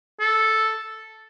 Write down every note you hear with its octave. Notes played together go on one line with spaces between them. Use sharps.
A4